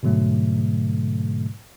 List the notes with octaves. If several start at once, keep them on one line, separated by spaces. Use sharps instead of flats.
G#2 B2 D3 F#3 A3